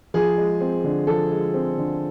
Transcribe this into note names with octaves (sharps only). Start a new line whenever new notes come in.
F3 G#4
G#3
C4
D3
F3 A4
G#3
C4
D3